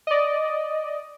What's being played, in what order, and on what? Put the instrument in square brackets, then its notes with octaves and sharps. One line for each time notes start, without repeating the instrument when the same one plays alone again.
[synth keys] D5 D#5